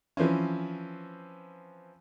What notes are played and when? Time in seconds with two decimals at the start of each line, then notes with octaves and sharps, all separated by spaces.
0.17 E3 F3 C4 C#4